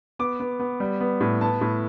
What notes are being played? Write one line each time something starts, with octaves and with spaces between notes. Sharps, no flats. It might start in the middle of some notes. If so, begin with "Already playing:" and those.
B3 D6
B3
B3
G3
B3
A2
B3 A5
A2